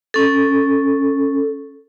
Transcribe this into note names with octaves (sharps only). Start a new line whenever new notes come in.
C#4 A4